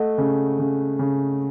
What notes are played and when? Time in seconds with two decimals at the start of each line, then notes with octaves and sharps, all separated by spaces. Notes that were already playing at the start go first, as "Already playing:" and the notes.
Already playing: A3 D#5 F#5
0.18 C#3
0.59 C#3
0.99 C#3